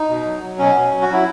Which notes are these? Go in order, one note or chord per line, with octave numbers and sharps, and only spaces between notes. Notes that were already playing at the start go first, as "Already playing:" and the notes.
Already playing: D#4
B2
F#3
F#3
B2 C#4
B2
F#3
F#4
F#3 E4